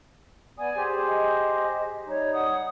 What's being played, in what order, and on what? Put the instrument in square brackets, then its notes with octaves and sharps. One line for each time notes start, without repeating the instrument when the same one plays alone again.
[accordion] B3 D#6 [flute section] D5 G#5
[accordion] G4 G#4 C5
[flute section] D#5
[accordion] G3 D#4 [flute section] C#5
[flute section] F#5 D#6